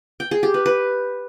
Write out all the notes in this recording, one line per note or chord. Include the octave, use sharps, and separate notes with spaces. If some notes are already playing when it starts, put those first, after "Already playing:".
G5
G#4
G4
B4
B4